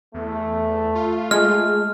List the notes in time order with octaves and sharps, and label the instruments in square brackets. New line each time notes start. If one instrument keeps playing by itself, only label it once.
[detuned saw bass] E2 [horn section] A3
[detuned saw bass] F4
[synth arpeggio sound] G#3 [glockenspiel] F6